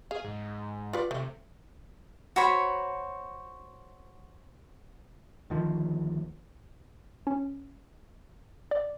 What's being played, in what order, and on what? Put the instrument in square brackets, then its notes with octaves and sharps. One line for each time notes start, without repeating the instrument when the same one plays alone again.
[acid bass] G#4 [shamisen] F5
[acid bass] G#2
[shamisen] F4 B4 D5
[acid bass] C3 [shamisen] A3
[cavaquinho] F#4 C5 C#5 B5
[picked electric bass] D2 D#3 F3
[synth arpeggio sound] C#4
D5